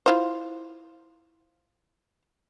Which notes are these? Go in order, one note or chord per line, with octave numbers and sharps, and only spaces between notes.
E4 F4 C5